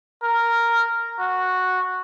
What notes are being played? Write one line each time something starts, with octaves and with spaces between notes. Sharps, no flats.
A#4
F#4